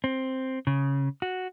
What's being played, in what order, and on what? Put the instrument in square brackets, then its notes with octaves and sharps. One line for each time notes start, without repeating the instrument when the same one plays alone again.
[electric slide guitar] C4
C#3
F#4